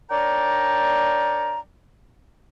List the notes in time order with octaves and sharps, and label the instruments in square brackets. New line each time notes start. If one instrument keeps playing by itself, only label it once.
[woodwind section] D4 A#4 C#5 D5 G5 A#5